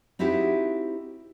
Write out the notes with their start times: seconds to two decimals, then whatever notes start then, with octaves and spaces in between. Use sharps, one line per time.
0.19 C4 D#4 E4 F#4 G4